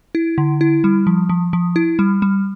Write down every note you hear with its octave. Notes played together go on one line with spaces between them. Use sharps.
E4
D3
E4
G3
F3
F3
F3
E4
G3
G3